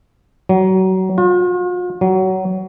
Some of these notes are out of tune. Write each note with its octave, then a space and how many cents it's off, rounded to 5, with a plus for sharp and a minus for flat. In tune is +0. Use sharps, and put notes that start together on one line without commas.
F#3 +25
F4 +45
F#3 +20